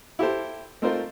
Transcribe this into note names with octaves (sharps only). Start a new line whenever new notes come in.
E4 G4 A4 C5
A3 C4 D#4 F4 A#4 C5